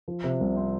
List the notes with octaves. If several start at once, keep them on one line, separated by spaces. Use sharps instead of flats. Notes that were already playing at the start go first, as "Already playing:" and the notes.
F3
C3
C2
C4